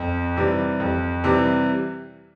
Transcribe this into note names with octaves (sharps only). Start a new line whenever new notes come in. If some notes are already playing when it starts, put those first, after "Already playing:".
Already playing: F2
C3 E3 G3
F2
C3 E3 G3